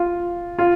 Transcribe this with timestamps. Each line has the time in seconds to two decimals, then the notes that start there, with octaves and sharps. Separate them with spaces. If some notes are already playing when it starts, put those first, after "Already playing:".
Already playing: F4
0.59 F4